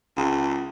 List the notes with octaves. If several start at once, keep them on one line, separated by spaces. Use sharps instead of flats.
C#2